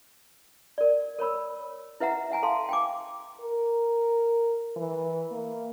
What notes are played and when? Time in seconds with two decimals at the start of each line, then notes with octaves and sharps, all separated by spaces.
0.78 A#4 D5
1.19 A#4 C#5 B5 E6
2.00 E4 B4 E5 F#5 A#5
2.30 E5 F#5 G#5 A#5
2.43 A4 F5 A5 C6
2.69 G5 G#5 D6
3.41 A#4
4.76 E3
5.31 A#3